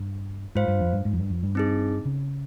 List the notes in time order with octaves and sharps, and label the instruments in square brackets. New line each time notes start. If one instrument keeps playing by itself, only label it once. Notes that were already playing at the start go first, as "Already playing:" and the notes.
Already playing: [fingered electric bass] G2
[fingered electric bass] G#2 [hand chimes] F4 C5 F5
[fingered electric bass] G2
F2
G2
G#2
F2
G2
F2
G2
[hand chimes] C4 D#4 G#4
[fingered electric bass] C#3